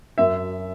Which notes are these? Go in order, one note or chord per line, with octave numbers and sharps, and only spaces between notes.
F#2 E5